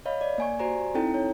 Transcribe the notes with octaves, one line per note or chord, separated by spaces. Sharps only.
C#5 D#5 F5 B5
D5
A#3 G#5 C#6
F#4 G4 C5 D5 G#5 A#5
C4 D#4 E4 A4 G5 A#5
C#5